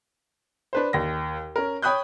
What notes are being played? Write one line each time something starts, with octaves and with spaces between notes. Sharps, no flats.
D4 B4 C5
D#2 A#6
C#4 A#4
C#5 G5 B5 D#6 F#6 G6